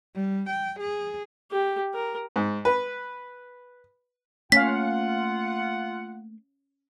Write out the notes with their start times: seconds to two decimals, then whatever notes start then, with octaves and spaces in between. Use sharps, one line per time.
0.15 G3
0.49 G5
0.80 G#4
1.51 G4
1.94 A#4
2.36 G#2
2.65 B4
4.52 A3 A#3 C#4 F4 F5 F#5 B6